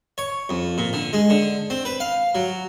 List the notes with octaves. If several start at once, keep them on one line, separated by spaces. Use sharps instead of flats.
C#5
F2
A#2
D3
G#3
D3
C4
B4
F5
F#3